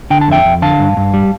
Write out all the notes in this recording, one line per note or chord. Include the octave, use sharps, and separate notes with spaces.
D3 G5
A5
F2 E5 G5
F2
D3 F5 A5
G2
G2
G3